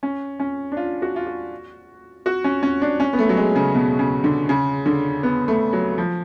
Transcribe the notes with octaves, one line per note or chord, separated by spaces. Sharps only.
C#4
C#4
D4
F4
F#4
F4
F#4
F#4
C#4
C#4
D4
C#4
B3
A3
F#3
G#3
C#3
B2
C#3
D3
C#3
D3
B3
A3
F#3
F3